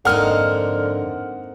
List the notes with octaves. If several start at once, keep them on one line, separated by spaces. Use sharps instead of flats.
F2 G#2 D3 A#3 C4 D#4 F#5 F6